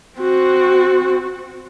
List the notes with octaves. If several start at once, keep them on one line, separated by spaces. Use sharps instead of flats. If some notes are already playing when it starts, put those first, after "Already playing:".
C4 F#4